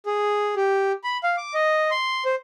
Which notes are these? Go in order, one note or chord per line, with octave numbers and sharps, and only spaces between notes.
G#4
G4
B5
F5
D6
D#5
C6
C5